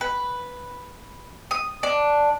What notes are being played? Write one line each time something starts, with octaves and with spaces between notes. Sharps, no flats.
B4
D#6
D4